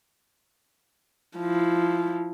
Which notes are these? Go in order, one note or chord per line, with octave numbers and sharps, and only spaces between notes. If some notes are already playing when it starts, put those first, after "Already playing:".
F3 E4